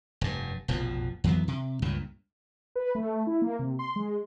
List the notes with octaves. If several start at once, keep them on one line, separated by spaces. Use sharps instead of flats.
F1 G2
F1 A#1 B2 F3
F2 E3 F#3 B3
C3
C#2 G2 A#2
B4
A3
E4
A#3
C3
C6
G#3